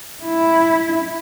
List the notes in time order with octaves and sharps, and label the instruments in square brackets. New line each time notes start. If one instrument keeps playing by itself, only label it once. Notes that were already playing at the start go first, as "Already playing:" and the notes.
[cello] E4